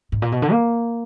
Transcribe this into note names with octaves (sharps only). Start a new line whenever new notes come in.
G#2
A#2
B2
D3
A#3